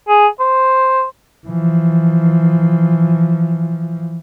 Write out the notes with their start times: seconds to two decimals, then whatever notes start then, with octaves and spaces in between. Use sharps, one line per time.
0.08 G#4
0.40 C5
1.47 E3 F3